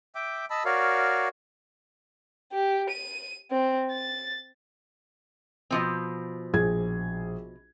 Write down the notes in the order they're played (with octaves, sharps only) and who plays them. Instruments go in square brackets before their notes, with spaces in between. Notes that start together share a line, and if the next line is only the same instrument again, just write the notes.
[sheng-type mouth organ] E5 G5 D6
D#5 A5 B5 E6
F#4 A#4 C#5 D5 F5
[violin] G4
D#7
C4
A6
[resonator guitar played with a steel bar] B2 F3 C4
[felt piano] A#1 G#4 G#6